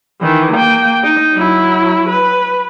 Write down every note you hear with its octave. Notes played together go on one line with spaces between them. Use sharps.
D#3 E3
A#3 G5
D#4
F#3 E4
B4